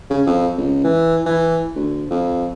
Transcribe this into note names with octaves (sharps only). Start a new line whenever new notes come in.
C#3
F2
C#2
E3
E3
D2
F2